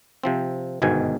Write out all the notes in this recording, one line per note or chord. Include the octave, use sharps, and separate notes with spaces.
C3 F3 C4
G1 G#2 B2 D#3 G#5